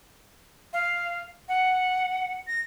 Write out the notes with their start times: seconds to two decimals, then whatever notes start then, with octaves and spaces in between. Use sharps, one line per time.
0.73 F5
1.48 F#5
2.47 A#6